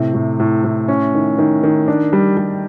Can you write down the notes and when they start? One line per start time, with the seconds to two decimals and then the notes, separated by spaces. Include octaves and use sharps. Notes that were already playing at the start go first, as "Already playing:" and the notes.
Already playing: A2 C3
0.14 A2
0.40 A2
0.64 A2
0.88 C#4
1.14 D#3
1.38 D#3
1.63 D#3
1.88 D4
2.13 G3
2.37 G3